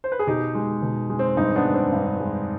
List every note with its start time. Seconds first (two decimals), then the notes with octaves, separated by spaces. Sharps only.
0.04 C5
0.12 B4
0.19 G#4
0.27 B2 D#4 G4
0.55 G#3
0.82 B2
1.10 G#3
1.19 C4
1.37 G2 C4 D#4
1.56 B3 D4
1.65 G#3
1.74 C4
1.92 G2
2.20 G#3